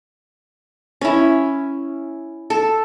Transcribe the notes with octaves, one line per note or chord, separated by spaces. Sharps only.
C#4 E4
A4